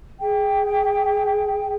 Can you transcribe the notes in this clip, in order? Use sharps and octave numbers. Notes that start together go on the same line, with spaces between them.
G#4 G5